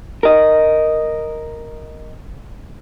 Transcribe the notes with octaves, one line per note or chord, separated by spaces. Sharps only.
A#4 D#5